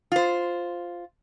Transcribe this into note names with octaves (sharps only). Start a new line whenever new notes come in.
F4 C5